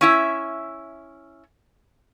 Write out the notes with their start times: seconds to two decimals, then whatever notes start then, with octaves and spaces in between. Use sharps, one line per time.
0.01 C#4 E4 E5